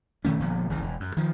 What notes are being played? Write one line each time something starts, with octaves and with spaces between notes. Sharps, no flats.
B2 D#3 A3 C#4
G1 A#2 F3 B3
G1 C2 C#3 E3
E1
F#2
D#3 F3